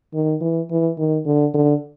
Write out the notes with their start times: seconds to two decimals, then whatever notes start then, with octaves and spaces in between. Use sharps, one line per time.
0.14 D#3
0.41 E3
0.70 E3
0.98 D#3
1.26 D3
1.54 D3